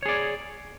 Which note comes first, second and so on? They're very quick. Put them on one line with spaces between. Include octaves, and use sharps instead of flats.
C#5 G#4 D5